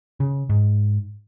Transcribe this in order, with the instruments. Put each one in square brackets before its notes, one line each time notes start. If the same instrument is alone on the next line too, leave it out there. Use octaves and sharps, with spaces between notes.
[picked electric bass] C#3
G#2